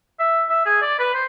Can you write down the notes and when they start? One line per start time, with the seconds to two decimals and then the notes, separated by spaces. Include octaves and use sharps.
0.19 E5
0.49 E5
0.65 G#4
0.82 D5
0.99 B4
1.14 C5